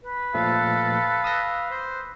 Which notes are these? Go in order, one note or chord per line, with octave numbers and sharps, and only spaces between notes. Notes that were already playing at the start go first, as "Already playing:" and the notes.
B4
A#2 F3 A3 A4 F5
D#6 E6 A#6
C5